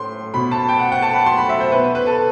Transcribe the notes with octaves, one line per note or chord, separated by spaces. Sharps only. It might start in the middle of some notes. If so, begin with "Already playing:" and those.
Already playing: A2 C6
B2 B5
A5
G5
F#5
F#5
A5
B5
C6
B5
E5
C5
B2 B4
B4
A4